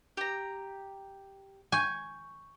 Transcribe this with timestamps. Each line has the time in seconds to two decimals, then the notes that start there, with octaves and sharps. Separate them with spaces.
0.17 G4 A#5
1.72 G#5 C#6 G6